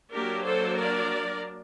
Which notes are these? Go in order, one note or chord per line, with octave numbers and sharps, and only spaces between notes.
F#3 A#3 D4 G4 A#4
A4 C5
A#4 D5